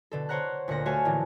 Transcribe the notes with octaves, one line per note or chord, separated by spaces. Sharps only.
B2 D3 A4
C5 C#5 F#5 A#5 F#6
D2 A#2 D3 F#5 A#6
A3 F#4 C#5 F5 G#5 A5
A#1 A2 D3 E3